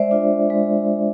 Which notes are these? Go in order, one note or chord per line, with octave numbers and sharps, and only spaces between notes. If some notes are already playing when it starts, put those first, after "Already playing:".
Already playing: G#3 C5 D5 E5
D4 F4
G#3